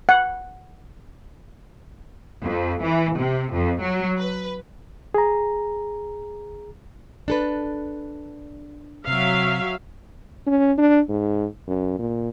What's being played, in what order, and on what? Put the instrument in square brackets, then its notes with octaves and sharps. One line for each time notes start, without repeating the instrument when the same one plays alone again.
[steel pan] F#5
[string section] F2
E3
C3
F2
F#3
B4
[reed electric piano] G#4 A#5
[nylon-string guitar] D4 A4 B4
[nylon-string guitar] C3 [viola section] F#3 E5 F5
[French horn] C#4
D4
G#2
F#2
A#2